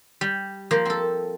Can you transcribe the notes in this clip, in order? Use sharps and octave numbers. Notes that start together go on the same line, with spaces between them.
G3
F3 A#3 C5
C4 A4